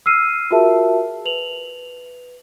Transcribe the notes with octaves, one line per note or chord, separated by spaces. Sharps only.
E6 F6 C7 D#7
F4 F#4 G#4 A#4 E5 A5
B4 F7 F#7